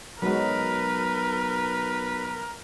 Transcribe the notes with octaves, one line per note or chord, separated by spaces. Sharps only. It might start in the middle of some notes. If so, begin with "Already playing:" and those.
B1 F#3 G#3 A#4 B4